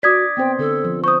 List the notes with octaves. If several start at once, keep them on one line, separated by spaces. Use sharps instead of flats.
F#4 D5 D#6 G#6 B6
B3 C4 C5 G5
D3 A4
F3
C5 C#6 D#6